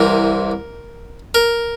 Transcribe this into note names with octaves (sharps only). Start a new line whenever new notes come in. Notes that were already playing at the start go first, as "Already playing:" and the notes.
Already playing: C2 C3 E3 A#4
A#4